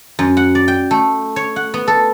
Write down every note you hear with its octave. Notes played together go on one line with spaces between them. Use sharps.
F#2
F#5
D5
G5
A3
C#5
F#5
B3
A4